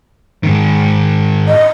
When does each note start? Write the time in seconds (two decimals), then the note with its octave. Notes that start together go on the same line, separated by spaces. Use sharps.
0.43 G#2 D#3
1.48 D#5